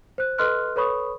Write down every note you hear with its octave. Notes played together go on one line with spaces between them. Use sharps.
C5 F#6
A4 B4 D#5 C6 F6 F#6
A4 B4 C#5 B5 C#6 D#6